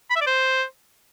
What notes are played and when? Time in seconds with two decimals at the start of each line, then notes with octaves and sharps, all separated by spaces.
0.10 B5
0.16 E5
0.21 D5
0.27 C5